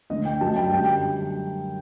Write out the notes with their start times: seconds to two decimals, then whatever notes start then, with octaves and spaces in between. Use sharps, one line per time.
0.10 D2 D3 A3 D#5
0.25 G5
0.41 F#2 F#3 A3 A5
0.56 G5
0.71 F#2 D3 G3 G5